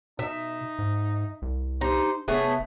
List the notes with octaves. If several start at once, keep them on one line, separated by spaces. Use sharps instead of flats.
B2 D#4 E5
G#2
C2
D#4 G4 C5
F1 A3 B3 G#4 C#5 E5